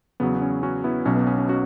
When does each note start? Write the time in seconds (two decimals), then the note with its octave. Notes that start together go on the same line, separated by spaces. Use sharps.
0.20 E2 C#3 F#3 B3
0.35 B3
0.42 C#4
0.63 C#4 F#4
0.84 B3 E4
1.05 B1 B2 F#3 C#4
1.16 B3
1.27 C#4
1.38 C#4
1.49 C#4 F#4